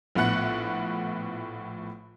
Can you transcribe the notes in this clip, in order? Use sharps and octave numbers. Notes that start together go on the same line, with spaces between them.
A#1 A2 B3 F#5 F#6 C#7